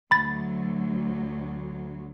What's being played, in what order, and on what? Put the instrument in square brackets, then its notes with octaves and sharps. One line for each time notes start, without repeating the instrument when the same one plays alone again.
[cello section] D2 F#3 [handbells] B5 A6